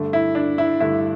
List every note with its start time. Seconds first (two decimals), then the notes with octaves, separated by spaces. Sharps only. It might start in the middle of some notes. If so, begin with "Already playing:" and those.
Already playing: G2 D3 A3
0.13 E4
0.35 D4
0.58 E4
0.80 G2 D3 A3 E4